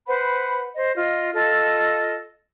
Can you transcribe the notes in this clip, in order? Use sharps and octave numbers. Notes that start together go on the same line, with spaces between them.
B4 C5 F#5 B5
C5 D#5
F4 D#5
F4 A4 D#5 E6